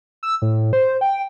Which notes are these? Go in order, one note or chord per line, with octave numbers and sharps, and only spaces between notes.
E6
A2
C5
G5